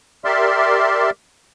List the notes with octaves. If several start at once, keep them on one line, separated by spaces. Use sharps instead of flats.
G4 A#4 D5 E5 C6